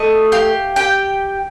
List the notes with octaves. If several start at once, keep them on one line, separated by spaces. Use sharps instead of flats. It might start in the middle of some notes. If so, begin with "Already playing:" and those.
Already playing: A3 D#5
G4 F5
G4 G5